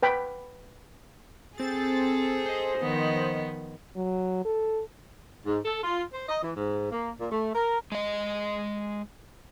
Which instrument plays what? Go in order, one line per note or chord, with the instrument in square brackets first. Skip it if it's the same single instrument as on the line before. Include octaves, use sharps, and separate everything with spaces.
[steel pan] B4 G5 B5
[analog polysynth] C4 A6 [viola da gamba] G#4 A4
[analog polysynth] C5 D#5
[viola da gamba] D#3 F3 B3
[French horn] F#3
A4
[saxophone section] G#2
A4
F4
C5
D#5
E3
G#2
A#3
A#2
A3
A#4
[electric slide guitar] G#3 D#5